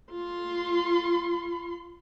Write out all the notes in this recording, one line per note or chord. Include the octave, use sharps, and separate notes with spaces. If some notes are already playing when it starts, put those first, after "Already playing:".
F4 C6